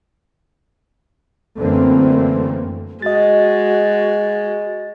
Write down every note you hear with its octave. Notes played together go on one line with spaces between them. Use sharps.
F#2 D3 E3 A3 A#3 C4
G#3 F#4 D#5 A6